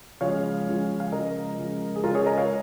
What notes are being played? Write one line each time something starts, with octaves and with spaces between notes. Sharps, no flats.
C#3 F3 G#3 C#5 F5
C#3 F3 G#3
F5
C#3 F3 G#3 A#4 D#5
C#3 F3 G#3
G#4
C#3 G#3 F4 A#4
G#4 C#5
A#4 D#5
C#5 F5